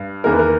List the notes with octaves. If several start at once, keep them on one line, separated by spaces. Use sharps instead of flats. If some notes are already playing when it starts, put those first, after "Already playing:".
Already playing: G2
E2 D#3 A#3 A#4
B4
A#4